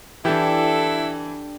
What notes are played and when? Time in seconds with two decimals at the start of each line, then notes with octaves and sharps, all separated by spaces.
0.25 E3 D4 E4 G4 A4